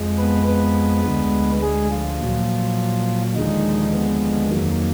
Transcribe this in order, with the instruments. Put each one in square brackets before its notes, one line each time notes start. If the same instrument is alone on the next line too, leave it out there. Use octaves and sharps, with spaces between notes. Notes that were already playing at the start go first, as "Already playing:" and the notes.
Already playing: [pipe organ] F2 F3 G#3
B3 B4
B3 B4
D2 D3 G#3
G#3 G#4
F3 F4
A#2 F#3
D#2 D3 D#3 F3 G#3 D#4
B3
F2 D#3 F#3 A#3